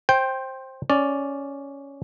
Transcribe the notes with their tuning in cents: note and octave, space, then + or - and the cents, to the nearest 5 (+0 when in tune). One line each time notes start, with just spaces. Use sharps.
C5 +15 G5 +0
C#4 +5 D5 +0